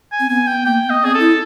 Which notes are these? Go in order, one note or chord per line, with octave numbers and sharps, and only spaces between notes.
G#5
C4
B3 G#5
G5
A#3 G5
B3
D#5
C4 G#4
A4
E4